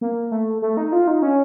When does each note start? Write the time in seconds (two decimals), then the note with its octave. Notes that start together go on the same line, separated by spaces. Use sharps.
0.01 A#3
0.32 A3
0.62 A3
0.77 D#4
0.92 F4
1.07 D#4
1.22 C#4